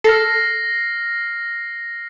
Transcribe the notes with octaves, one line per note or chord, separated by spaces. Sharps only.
A4 F6 A#6 C7